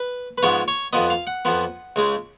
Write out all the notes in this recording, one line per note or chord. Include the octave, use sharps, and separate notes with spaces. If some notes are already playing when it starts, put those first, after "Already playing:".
Already playing: B4
B4
G#2 F3 B3 C#5
C#5
F2 F3 B3 D#5
F5
F#5
F2 F3 B3
C#2 C#3 G#3